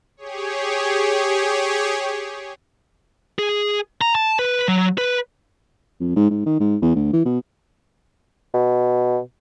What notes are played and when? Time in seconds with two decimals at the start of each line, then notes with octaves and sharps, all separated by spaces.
0.17 G4 G#4 C#5
3.39 G#4
4.01 A#5
4.15 A5
4.39 B4
4.68 F#3
4.98 B4
6.00 F2
6.16 G#2
6.30 G#2
6.46 D#3
6.60 G#2
6.82 E2
6.95 D2
7.13 E3
7.25 B2
8.54 B2